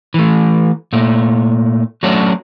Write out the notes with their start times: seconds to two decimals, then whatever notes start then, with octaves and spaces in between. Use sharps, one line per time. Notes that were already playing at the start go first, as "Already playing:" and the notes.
0.14 E3 A3
0.93 A#2 A3
2.03 F#3 A3 C#4 D4 F#4